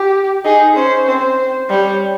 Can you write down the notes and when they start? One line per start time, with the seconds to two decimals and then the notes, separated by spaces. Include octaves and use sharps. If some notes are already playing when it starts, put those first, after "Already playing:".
Already playing: G4
0.45 D#4 G#4
0.76 C#4 C5
1.07 C4 C5
1.70 G3 C#5